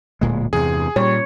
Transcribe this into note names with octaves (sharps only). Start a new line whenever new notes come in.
D1 A#2 G#3
E2 G2 C3 G#4
A#2 G3 C#5